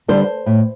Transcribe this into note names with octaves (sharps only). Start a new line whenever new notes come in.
D3 G3 C5
A2